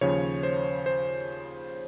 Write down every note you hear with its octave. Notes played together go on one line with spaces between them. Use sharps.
D#2 C#3 F3 C#5
C5
C5